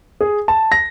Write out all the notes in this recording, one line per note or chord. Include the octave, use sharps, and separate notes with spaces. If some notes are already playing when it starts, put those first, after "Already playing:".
G#4
A5
A#6